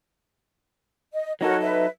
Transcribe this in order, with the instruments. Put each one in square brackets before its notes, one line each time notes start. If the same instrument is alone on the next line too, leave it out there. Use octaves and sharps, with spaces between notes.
[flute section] D#5
[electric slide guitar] F#3 D#4 A4 [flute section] F#4 A#4 C#5
[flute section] B4 E5